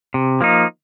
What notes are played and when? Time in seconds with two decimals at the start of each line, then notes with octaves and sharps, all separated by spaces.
0.14 C3
0.41 F3 A#3 D#4